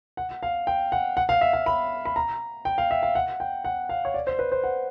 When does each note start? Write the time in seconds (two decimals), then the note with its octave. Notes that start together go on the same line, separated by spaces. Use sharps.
0.17 F#5
0.43 F5
0.67 G5
0.92 F#5
1.17 F#5
1.29 F5
1.41 E5
1.53 F5
1.66 B5
2.05 B5
2.16 A#5
2.65 G5
2.78 F5
2.91 E5
3.03 F5
3.15 F#5
3.40 G5
3.64 F#5
3.89 F5
4.05 C#5
4.14 D5
4.27 C5
4.39 B4
4.52 C5
4.64 F#5